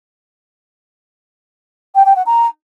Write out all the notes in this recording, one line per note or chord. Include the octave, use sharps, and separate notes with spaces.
G5
G5
F#5
A#5